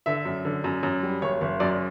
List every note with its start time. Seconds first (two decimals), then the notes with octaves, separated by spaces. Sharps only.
0.06 D3 E5
0.25 F#2
0.45 D3
0.64 F#2
0.83 F#2
1.03 G3
1.22 F#1 C#5
1.41 F#1
1.60 F#2 D5